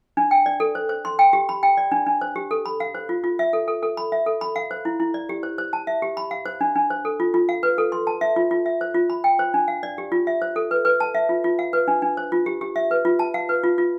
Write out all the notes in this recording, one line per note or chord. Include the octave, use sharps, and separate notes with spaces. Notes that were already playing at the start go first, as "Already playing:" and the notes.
D4
G5
D5
A4
C5
C5
C6
G5
G4
B5
G5
D5
D4
D4
C5
G4
A4
B5
F5
C5
F4
F4
E5
A4
A4
A4
B5
E5
A4
B5
F5
C5
E4
E4
D5
G4
C5
C5
A5
E5
G4
B5
F5
C5
D4
D4
C5
A4
F4
F4
F5
B4
A4
C6
A5
E5
F4
F4
E5
C5
F4
B5
G5
C5
D4
F5
D5
G4
F4
E5
C5
A4
B4
B4
A5
E5
F4
F4
F5
B4
D4
D4
C5
F4
G4
G4
E5
B4
F4
A5
F5
B4
F4
F4